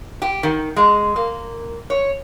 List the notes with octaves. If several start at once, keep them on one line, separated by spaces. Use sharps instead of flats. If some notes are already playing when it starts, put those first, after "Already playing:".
G4
D#3
G#3
A#3
C#5